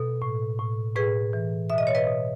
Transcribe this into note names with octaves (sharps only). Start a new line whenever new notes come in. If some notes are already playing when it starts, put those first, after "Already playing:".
Already playing: B2 A4
A2
A2
A2 G#4 B4
E3
B2 E5
D#5
C#5
B4 D#5
B2